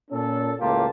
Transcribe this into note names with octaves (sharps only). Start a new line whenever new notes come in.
A#2 C#4 A4
C#2 A2 A#3 F4 G4 A5